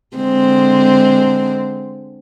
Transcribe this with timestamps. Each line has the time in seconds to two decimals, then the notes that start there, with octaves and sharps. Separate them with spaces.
0.17 D3 G#3 C4